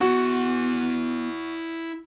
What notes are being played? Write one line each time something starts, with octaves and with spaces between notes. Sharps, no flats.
B3 E4 F#4 F#5